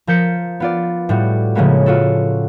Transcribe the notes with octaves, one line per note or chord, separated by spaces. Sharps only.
F3 A#4 A5 G6 B6 C#7
B3 F4 D5
A2 G3 F#4
A2 C#3 F3 G#3 A#3 B3
F4 F#4 A4